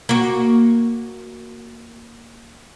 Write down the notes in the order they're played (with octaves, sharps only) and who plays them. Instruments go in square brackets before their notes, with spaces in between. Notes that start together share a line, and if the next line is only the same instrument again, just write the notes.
[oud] A#3 F#4